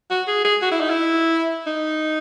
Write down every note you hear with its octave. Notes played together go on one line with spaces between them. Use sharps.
F#4
G#4
G#4
F#4
E4
D#4
E4
D#4